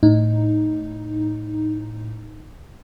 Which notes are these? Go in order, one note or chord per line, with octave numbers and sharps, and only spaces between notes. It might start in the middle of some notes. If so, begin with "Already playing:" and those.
A2 D#4